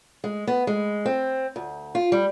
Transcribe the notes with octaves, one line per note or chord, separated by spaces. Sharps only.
G#3
B3
G#3
C4
D2
F4
G3